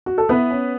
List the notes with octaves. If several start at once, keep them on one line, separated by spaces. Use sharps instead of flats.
F#4
A4
B3 E4 B4
C#4